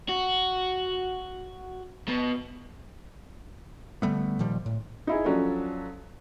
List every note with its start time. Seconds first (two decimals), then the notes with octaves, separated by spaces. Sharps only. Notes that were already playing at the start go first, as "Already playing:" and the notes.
0.09 F#4
2.08 B2
4.02 D3 G3 A3 B3
4.39 A#2 D#3 F3 G3
4.66 A2
5.07 D#4 E4 G#4
5.25 F3 F#3 C#4 D4 A4